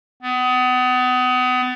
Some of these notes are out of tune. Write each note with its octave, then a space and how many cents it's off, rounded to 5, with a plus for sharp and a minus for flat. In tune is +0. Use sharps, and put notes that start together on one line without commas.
B3 +30